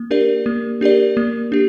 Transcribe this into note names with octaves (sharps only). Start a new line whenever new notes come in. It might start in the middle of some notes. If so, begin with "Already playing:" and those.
Already playing: A#3
D4 G4 A#4 D5
A#3
D4 G4 A#4 D5
A#3
D4 G4